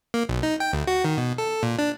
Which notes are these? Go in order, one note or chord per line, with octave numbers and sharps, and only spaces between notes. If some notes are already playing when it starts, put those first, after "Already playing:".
A#3
B1
D#4
G5
D2
F#4
D#3
B2
A4
A#2
D4